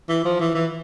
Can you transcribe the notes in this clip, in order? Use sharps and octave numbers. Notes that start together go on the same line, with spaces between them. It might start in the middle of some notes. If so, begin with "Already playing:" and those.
E3
F3
E3
E3